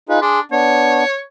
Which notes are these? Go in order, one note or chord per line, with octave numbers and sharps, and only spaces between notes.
D#4 F4 G#4 B4
D4 G#4 C6
B3 D4 C#5